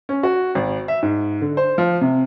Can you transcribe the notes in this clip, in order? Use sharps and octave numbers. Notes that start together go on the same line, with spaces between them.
C#4
F#4
G#1
E5
G#2
D3
C5
F3
C3